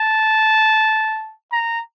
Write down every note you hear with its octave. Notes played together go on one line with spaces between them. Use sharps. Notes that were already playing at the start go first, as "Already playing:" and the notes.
Already playing: A5
A#5